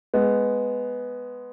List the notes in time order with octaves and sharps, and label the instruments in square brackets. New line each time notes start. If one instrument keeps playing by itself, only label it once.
[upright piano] G#3 B3